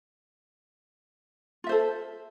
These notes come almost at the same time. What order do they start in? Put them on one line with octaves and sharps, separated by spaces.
F4 E5 C5 A4